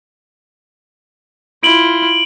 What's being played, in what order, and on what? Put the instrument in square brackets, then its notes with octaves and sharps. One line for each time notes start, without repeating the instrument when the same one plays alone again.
[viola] E4 F4 [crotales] D7 F#7 G7